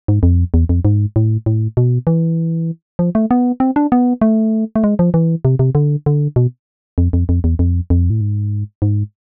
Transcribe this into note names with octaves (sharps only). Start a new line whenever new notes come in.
G#2
F2
E2
F2
G#2
A2
A2
B2
E3
F3
A3
B3
C4
D4
B3
A3
A3
G#3
F3
E3
C3
C3
D3
D3
B2
F2
F2
F2
E2
F2
F2
A2
G#2
G#2